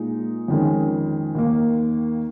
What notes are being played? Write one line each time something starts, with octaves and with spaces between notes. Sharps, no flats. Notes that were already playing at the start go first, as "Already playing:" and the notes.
Already playing: A#2 G#3 D#4
F2 D#3 G#3 C#4
D#2 D#3 A#3